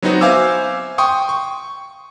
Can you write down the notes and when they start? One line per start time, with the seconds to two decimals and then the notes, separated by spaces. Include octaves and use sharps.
0.02 F#3 B3 C4 D#4 F#4
0.21 C5 E5 F5 G#5 D6 E6
0.98 G5 C6 C#6 D#6
1.29 C#6